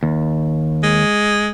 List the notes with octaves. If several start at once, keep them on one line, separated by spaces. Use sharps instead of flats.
D#2
G#3